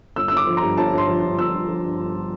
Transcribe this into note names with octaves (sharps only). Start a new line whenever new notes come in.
G1 E6
G1 E6
D6
F3
A#5
G2
G1 A5
G1
C6
F3
G2
G1 E6
G1
F3
G2
G1